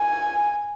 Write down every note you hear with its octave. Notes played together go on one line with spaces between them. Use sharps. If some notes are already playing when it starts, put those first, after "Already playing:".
Already playing: G#5